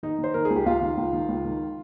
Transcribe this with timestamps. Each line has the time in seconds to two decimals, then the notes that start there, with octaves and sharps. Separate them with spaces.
0.03 D#3 D#4
0.19 D#3 C5
0.34 D#3 A#4
0.45 G#4
0.50 C#2
0.56 G4
0.66 C#2 F4
0.81 D#3
0.97 C#2
1.13 D#3
1.29 C#2
1.44 D#3